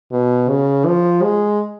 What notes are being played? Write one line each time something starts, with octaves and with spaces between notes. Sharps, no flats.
B2
C#3
F3
G#3